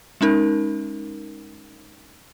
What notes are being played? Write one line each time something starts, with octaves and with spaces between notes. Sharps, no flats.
G#3 C#4 D#4 A#4